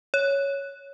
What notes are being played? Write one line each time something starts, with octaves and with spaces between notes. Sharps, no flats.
C#5